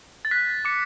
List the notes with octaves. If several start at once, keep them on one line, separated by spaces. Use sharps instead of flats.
A6
F#6 B6
D6 C#7